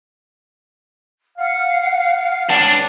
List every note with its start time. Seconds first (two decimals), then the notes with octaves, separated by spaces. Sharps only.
1.38 F5 F#5
2.49 C#2 D4 C#5 D5